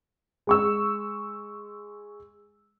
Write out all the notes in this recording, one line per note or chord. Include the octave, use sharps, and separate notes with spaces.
G#3 C#6 E6